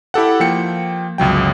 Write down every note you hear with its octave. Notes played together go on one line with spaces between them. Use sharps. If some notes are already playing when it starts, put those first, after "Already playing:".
E4 G4 A4 F#5
F3 A#3 G5 C#7
G1 C#2 F#3 G5